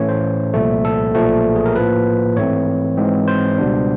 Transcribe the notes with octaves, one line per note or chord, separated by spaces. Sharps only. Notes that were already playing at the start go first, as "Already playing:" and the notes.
Already playing: A2 E3 A3 C#4 C#5
C5
C2 A#2 F3 A3
A4
B1 A#2 F3 A3
G#4
A#4
A2 F3 A#3 B4
G#2 E3 A3 C4 C#5
G#2 E3 G#3 C4
C5
C#2 B2 G3 B3 D4